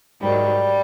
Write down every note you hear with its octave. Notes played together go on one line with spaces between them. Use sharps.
G#2 D#3 F#3 G3